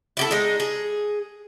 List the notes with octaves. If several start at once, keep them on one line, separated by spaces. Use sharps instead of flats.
E4 G4 A4
G#3 D#4
G#4